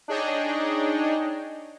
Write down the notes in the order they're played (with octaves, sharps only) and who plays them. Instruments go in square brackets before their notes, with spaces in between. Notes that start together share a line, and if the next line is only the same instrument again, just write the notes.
[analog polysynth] D4 D#4 G#4 C#5 D#5 G5